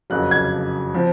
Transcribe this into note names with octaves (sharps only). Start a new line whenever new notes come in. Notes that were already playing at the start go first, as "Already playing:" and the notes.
F#1 F2 C#3 F#3 F#6
G#6
F3 C4